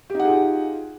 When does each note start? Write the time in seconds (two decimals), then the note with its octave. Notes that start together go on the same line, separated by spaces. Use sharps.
0.10 G4
0.15 D#4
0.19 F#5
0.24 G#4
0.29 F4